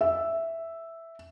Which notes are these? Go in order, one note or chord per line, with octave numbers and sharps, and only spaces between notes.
E5